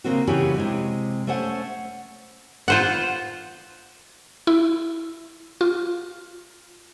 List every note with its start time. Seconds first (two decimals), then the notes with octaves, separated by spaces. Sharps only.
0.04 C#3 A#3 C4 F#4
0.27 C#3 E3 C#4 F#4 G4
0.57 C3 G#3
1.27 A3 C#4 C5 F#5
2.68 F4 C5 F#5
4.47 E4
5.61 F4